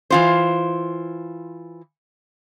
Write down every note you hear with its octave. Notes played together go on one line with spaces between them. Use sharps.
E3 F4 C5